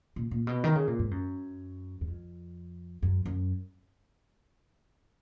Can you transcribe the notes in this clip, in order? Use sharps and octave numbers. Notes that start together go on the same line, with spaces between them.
A#2
A#2
B2
D#3
C#3
A#2
G#2
F#2
F#2
F2
F#2
F#2